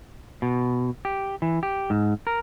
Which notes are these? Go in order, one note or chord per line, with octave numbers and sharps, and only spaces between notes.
B2
G4
E3
G4
G#2
A#4